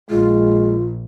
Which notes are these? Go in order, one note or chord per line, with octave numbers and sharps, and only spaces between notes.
A#1 G#3 F4